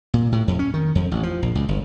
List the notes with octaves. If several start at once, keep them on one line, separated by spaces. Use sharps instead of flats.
A#2
A2
F2
C#4
D#3
F2
A1
F3
A#1
C#2
G1